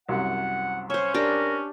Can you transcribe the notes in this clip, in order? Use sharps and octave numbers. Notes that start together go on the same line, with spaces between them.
C2 F#2 F#5
C#4 C5 C#5 E5
D4 G4 A#4